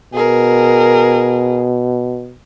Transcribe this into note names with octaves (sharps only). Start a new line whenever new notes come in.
B2 G#4 A#4